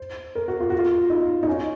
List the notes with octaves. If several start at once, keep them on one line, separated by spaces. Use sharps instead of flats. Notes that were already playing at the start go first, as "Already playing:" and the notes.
Already playing: C5
A#4
F#4
F4
F#4
F4
D#4
D#4
C#4